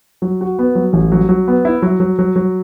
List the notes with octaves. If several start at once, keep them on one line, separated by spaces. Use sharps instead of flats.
F#3
F#4
B3
F#3
A1
F#3
F#3
B3
E4
F#3
F#3
F#3
F#3